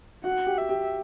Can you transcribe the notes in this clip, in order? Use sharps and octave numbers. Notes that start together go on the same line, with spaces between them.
F#4 F#5
G4
E5
G4